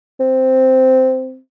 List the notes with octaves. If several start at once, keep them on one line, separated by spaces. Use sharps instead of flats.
C4